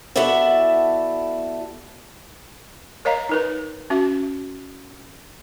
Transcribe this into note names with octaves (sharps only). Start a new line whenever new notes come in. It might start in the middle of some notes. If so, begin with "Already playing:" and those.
B3 E4 F#4 A4 D5 E5
A#4 C#5 D#5 F5 A#5
D#4 A#4 B4
C#4 F#4 E5